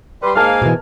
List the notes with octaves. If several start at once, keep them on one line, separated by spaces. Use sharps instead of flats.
G3 B4 C6
G#2 A#3 A#4 F5 G#5 A5 F6
B2 E3